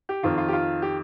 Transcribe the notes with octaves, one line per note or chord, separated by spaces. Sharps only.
G4
F2 D#3 F4
F4
G4
F4
G4